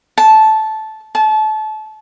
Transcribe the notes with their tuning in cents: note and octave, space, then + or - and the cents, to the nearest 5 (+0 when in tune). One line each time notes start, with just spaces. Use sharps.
A5 -10
A5 -30